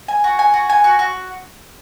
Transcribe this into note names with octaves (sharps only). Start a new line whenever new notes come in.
G#5
F#4
G#5
F#4
G#5
F#4
F#4